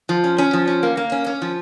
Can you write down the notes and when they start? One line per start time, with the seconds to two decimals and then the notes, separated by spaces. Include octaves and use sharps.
0.09 F3
0.24 C#4
0.38 C#4
0.53 F3
0.67 C#4
0.83 A#3
0.97 A#3
1.12 C#4
1.26 C#4
1.42 F3